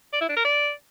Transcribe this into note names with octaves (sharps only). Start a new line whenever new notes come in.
D5
E4
D4
A#4
D5